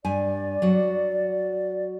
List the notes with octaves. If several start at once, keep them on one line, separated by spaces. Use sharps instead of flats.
G2 D5 G#5
F#3 F#4